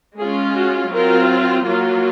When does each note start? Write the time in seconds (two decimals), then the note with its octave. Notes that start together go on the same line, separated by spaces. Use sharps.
0.19 G#3 C#4 F4 G#4
0.56 F#4
0.92 F#3 C4 F4 A#4
1.66 F#3 A#3 F4